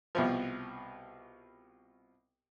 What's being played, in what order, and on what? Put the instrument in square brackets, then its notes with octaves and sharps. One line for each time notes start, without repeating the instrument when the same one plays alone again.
[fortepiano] C2 B2 F3